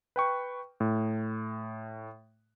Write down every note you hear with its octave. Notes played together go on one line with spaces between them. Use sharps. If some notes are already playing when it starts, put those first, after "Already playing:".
B4 G5 C#6
A2